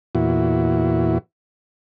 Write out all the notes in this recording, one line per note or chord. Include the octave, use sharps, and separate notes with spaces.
E2 A#2 E4 F#4